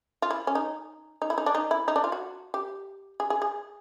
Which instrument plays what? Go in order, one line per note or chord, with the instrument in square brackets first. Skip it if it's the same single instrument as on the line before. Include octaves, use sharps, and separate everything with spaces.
[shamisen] F4
E4
C#4
D#4
D#4
E4
D#4
D4
D#4
E4
D#4
D4
F4
F#4
G4
G#4
G#4
G#4